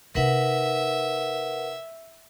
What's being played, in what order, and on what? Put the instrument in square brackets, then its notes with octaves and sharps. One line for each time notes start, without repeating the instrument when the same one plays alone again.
[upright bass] C3 D#4 [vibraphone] A#4 B4 F#5 [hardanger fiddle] E5